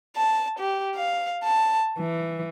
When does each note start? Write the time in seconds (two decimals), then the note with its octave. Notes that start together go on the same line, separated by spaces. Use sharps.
0.16 A5
0.60 G4
0.96 F5
1.44 A5
1.99 E3